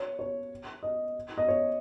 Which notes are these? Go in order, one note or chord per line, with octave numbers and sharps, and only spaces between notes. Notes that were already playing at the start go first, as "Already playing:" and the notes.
Already playing: C#5
C#5
D#5
D#5
C#5